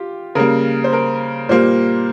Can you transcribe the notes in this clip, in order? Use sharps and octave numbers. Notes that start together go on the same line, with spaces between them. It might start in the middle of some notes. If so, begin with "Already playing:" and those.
Already playing: F4 G4
C#3 G3 A#3 A#4
C5
A#4
A#2 G3 A#3 C5